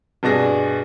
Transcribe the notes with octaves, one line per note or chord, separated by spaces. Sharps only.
G2 B2 D4 G#4 A#6